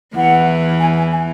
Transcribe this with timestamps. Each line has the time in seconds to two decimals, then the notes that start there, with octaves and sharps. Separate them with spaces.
0.16 E2 E3 F#5
0.80 G#5
0.96 G#5
1.11 G#5